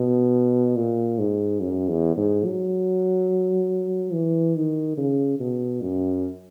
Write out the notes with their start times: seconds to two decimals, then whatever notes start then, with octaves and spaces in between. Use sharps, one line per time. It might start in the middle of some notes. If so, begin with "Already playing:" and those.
Already playing: B2
0.76 A#2
1.19 G#2
1.60 F#2
1.88 E2
2.17 G#2
2.45 F#3
4.13 E3
4.56 D#3
4.98 C#3
5.40 B2
5.82 F#2